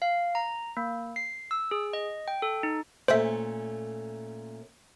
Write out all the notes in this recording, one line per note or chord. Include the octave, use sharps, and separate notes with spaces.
F5
A#5
A#3
C7
E6
G#4
D#5
G5
A4
D#4
A#2 A3 C#4 C5 E5